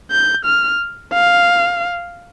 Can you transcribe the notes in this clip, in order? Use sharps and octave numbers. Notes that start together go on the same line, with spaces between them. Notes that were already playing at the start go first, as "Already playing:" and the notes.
G6
F6
F5